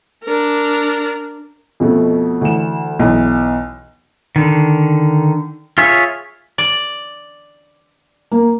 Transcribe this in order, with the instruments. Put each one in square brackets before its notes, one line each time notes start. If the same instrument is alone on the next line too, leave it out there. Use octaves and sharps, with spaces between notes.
[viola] D4 A#4
[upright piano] F2 B2 A3
D2 E3 E7
B1 E2 E3
[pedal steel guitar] D3 D#3
F4 G#4 C#5 E5
[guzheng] D5
[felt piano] A#3